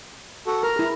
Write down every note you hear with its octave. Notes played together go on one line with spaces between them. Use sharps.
F#4 A4
A#4 A#5 F6
E4 G#4